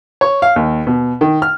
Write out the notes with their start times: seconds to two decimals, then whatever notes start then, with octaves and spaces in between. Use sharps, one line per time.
0.21 C#5
0.42 F5
0.56 D#2
0.87 B2
1.21 D#3
1.42 F6